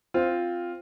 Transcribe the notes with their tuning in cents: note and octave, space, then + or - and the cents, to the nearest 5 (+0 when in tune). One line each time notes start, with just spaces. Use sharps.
C4 +0 F4 +0